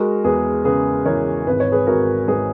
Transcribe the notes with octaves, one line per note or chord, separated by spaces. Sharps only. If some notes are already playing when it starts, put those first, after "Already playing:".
Already playing: G#3 F#4 A#4
E2 G#4 B4
C#3 G#4 B4
E3 A#4 C#5
G#1 B4
C#5
G#4 B4
G#1 F#4 A#4
G#2 G#4 B4